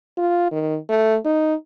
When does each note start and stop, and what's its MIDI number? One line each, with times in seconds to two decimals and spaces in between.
0.17 0.51 65
0.52 0.77 51
0.89 1.16 57
1.25 1.55 63